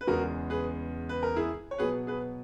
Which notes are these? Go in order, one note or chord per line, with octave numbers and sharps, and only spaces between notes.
B4
E2 C#3 G#3 B3 F#4 A#4
G#4 B4
B4
A#4
E4 G#4
C#5
B2 F#3 B3 G#4 B4
G#4 B4